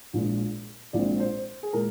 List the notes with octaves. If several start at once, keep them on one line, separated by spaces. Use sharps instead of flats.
A#1 A#2 G#3
A#1 A#2 G#3 C4 D5
C5
G#4
A#2 G#3 A#4